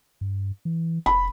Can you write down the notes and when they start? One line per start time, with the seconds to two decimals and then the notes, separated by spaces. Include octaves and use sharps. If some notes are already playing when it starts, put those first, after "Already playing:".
0.21 G2
0.65 E3
1.06 F1 B5